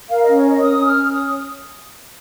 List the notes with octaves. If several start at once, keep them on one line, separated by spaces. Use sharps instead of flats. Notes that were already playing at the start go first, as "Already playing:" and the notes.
A#4 F5
C#4 D#5
C#5
A#4 D#5
C#4 D#6
C#4
F6
C#4
C#5 D#6